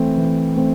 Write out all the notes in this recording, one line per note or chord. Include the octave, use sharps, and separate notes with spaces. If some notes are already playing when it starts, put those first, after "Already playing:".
Already playing: E3 A3 C4 G5
E3
A3 C4